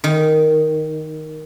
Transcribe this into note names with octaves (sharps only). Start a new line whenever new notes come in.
D#3